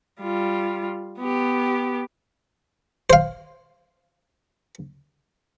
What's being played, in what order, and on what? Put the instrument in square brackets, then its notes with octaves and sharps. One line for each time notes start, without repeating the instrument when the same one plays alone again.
[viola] G3 F4
B3 G4
[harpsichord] C5 F5